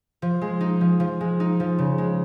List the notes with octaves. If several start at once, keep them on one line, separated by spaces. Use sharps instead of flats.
F3
G#3
D#4
F3
F3
G#3
D#4
F3
C#3
G#3